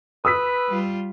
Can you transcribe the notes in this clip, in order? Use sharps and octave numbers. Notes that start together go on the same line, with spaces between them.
B4 D#6 E6 B6
G3 F4